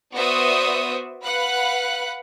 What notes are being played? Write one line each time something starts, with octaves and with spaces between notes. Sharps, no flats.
B3 F#4 C5 D5 E5 D#6
B4 F5 F#5 B5 F#6